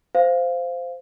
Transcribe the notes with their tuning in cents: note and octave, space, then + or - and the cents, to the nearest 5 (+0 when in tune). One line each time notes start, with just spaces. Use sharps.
C5 -10 F5 +0